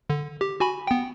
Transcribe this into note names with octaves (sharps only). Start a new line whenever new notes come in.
D3
G4
F#4 G#5 B5
B3 G5